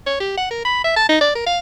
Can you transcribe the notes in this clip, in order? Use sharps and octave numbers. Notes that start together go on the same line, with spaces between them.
C#5
G4
F#5
A#4
B5
E5
A5
D#4
D5
A#4
F5